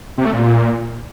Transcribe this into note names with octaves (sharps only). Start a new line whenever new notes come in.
C3
A3
A#2